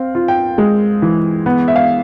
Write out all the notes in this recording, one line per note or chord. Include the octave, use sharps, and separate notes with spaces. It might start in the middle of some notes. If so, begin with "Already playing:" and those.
Already playing: C4 F5
F4
G5
G#3
E3
B3
E5
F5